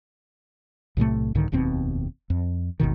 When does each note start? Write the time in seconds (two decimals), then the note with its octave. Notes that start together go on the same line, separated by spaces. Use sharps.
0.97 B1 A2 C3 A3
1.35 C2 G#2 D3 D#3
1.52 F1 D#2 B2 C4
2.30 F2
2.80 G#1 D#2 B2 D#3